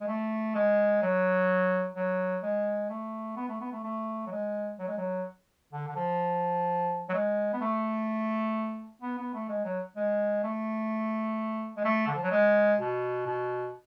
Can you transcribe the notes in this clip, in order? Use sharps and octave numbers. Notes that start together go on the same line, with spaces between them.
G#3
A3
G#3
F#3
F#3
G#3
A3
B3
A3
B3
A3
A3
F#3
G#3
F#3
G#3
F#3
D3
D3
F3
F#3
G#3
B3
A3
B3
B3
A3
G#3
F#3
G#3
A3
G#3
A3
D3
F3
F#3
G#3
B2
B2